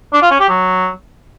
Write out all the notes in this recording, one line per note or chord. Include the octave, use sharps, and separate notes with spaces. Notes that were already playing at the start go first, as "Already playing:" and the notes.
D4
F4
C#4
G4
F#3